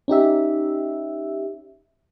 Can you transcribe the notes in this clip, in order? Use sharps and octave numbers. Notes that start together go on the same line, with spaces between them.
C#4 D#4 G4 E5